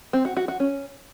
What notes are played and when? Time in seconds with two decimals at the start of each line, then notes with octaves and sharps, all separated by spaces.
0.13 C4
0.25 F#4
0.37 F#4
0.48 F#4
0.60 C#4